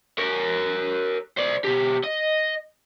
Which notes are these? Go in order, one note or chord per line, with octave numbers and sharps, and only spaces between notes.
A#4 C#5
C5 D5
B2 G4
D#5